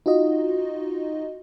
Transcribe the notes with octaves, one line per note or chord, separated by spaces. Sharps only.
D#4 F4 F#4 D#5